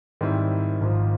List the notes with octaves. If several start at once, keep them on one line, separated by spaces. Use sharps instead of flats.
G#2 D#3 G3 C4 E4
G#1 G#2 F3